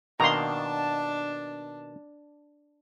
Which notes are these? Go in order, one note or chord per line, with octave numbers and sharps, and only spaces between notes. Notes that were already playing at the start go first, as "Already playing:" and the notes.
B2 D#3 A#3 D4 A5 A#5 C6